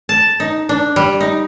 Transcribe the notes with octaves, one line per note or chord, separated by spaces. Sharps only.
A5
D#4
D4
G3
D#4